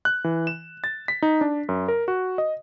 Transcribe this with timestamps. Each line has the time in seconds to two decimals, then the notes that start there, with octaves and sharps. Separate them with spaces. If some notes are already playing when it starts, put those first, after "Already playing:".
0.05 F#6
0.24 E3
0.47 E7
0.84 A6
1.08 B6
1.22 D#4
1.41 D4
1.69 F#2
1.88 A#4
2.08 F#4
2.38 D#5